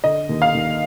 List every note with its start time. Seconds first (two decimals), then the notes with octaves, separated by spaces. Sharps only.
0.04 D3 D#5
0.29 D#2
0.42 F5
0.54 D#2